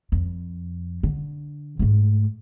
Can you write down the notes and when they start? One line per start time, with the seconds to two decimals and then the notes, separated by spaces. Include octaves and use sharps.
0.12 F2
1.03 D3
1.79 G#2 A3